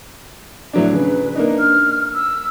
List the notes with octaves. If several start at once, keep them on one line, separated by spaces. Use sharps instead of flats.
A2 F#3 D4
C#3 B4
A#3 D4 D#4
F6
E6